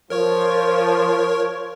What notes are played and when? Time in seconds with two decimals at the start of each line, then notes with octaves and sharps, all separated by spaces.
0.10 F3 A#4 C#5 C#6